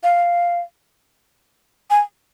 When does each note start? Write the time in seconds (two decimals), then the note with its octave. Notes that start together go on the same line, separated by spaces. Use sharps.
0.03 F5
1.90 G#5